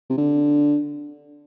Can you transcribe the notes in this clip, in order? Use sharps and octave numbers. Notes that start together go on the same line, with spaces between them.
C3
D3